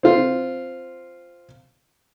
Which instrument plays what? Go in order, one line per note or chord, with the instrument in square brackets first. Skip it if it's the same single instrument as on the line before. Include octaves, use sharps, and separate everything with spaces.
[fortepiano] C4 F4